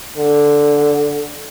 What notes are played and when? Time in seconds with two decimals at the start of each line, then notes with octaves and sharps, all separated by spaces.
0.17 D3